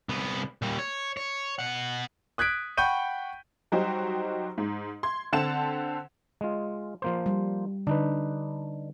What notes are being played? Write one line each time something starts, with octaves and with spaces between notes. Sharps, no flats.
C2 B3
A#2 G3
C#5
C#5
B2 F#5
D#6 F#6 G#6 B6 D7
F#5 G5 B5 C#6 G6 D#7
F#3 G3 D#4 F#4 G4 C5
G#2
C6 G#6
D3 C4 F#5 A5 E7
G#3 F4
F3 A#3 C5
G3
D3 D4 D#4 B4